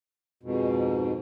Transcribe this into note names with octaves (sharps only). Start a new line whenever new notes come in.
F2 G#2 B2